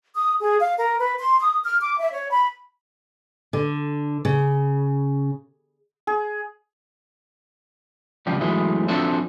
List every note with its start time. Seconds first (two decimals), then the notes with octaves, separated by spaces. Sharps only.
0.15 D#6
0.40 G#4
0.60 F5
0.78 A#4
0.99 B4
1.20 C6
1.40 D#6
1.64 F6
1.81 D6
1.99 E5
2.12 C#5
2.31 B5
3.53 D3
4.25 C#3
6.07 G#4
8.27 C#2 F3 G3 G4
8.41 E3 F#3 G#3 A3 E4
8.88 F3 C4 D4 F#4 A4 E5